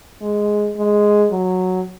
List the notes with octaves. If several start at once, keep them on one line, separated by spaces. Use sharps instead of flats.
G#3
G#3
F#3